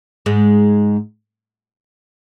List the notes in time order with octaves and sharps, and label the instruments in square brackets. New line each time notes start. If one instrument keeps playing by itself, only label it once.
[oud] G#2 G#3